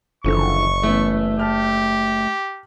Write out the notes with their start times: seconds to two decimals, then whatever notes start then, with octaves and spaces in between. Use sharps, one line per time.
0.24 F#1 D3 E3 F3 C#6
0.83 E3 A3 B3 C#4
1.40 G4 A5 F6